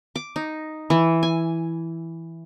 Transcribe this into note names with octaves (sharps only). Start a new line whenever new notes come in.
D6
D#4
E3
G#5